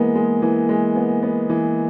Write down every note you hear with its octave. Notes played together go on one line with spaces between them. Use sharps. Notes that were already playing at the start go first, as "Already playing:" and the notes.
Already playing: E3 G#3 A#3 B3 A#4
G#3
E3
G#3
B3
B3
E3